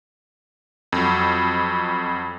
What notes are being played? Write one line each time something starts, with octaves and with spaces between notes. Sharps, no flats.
F2 F#3